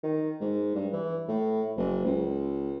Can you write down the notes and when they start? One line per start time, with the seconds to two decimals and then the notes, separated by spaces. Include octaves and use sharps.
0.04 D#3
0.41 G#2
0.75 G2
0.93 E3
1.28 A2
1.77 F#1
2.05 C#2